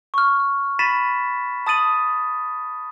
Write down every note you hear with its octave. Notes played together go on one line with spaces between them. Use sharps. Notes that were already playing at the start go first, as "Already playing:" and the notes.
C#6 F6
B5 A6 B6 D#7 E7
A5 D#6 A6 D#7 F#7